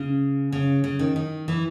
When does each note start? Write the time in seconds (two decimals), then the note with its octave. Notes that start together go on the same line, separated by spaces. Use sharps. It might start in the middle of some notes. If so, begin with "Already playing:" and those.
Already playing: C#3
0.52 C#3
0.84 C#3
0.99 D#3
1.16 D#3
1.48 E3